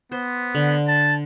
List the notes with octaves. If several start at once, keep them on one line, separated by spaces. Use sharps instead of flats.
B3 C5
D3
A5